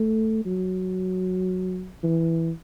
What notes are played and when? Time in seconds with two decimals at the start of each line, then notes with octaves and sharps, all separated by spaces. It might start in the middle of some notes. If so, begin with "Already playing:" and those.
Already playing: A3
0.45 F#3
2.03 E3